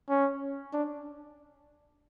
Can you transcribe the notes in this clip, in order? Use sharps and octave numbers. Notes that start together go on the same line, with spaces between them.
C#4
D4